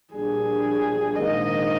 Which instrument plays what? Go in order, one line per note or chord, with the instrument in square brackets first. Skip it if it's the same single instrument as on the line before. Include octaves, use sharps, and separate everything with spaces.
[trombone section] A#1 A#2 G3 D4 [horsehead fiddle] G#4
[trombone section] A#1 G#2 D#3 A#3 [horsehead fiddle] D#5